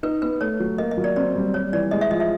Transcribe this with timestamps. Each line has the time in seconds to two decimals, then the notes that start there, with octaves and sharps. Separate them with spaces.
0.03 D#4 B4
0.22 B3 B4
0.40 A3 C#5
0.60 F#3
0.78 A#3 D#5
0.91 D#5
0.97 F#3
1.04 D5
1.16 C4 D5
1.35 G3
1.54 G3 C#5
1.73 E3 D5
1.91 G#3 D#5
2.01 E5
2.11 F3 D#5
2.20 E5